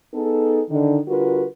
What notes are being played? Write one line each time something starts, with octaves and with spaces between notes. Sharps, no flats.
B3 D#4 G#4 A4
D3 D#3 D#4
D3 G3 F4 F#4 A#4 B4